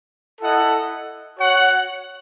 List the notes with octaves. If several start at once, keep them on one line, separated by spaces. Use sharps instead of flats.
E4 A4 D#5 F#5
F#4 C#5 F#5